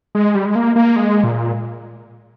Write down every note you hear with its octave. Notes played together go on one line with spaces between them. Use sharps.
G#3
G3
G#3
A#3
A#3
G#3
A#2